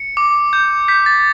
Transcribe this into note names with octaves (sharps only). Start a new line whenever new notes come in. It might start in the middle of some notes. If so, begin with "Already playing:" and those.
Already playing: C#7
D6
G6
G6 B6
A6